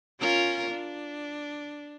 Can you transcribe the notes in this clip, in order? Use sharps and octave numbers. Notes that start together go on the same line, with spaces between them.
C#4 F4 A#4
D4